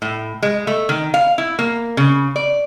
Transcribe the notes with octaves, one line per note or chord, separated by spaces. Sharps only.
A2
G#3
A3
D#3
F5
E4
A#3
C#3
D5